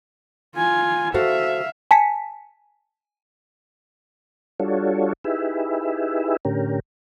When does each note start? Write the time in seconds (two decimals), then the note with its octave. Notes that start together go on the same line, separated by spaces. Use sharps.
0.57 F4 G#5
1.14 F#4 A4 C5 E5 F5
1.91 G#5 A5 B6 C#7
4.60 G3 D4 F4 F#4 A4 C#5
5.24 D#4 E4 G4 G#4 B4 E5
6.45 A2 D3 C#4 G4 A#4